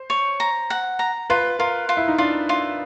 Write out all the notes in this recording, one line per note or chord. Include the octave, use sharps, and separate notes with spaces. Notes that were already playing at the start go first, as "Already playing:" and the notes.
Already playing: C5
C#5
A#5
F#5
A#5
F4 B4
F4 A#4
F4
E4
D#4
D4 F4
F4